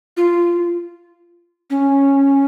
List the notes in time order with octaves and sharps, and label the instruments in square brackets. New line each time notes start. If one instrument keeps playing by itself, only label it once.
[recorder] F4
C#4